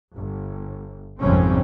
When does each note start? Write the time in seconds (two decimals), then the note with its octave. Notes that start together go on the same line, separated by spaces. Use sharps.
0.15 G1
1.21 G#1 F2 C3 G3 C4 C#4